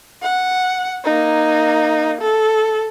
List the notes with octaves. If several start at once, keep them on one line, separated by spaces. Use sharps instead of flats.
F#5
A#3 D#4
A4